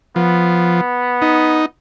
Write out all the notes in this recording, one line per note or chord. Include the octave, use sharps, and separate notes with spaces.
F3 B3
D#4